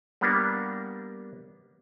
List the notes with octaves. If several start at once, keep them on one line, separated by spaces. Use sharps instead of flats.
G3 A#3 B3 D4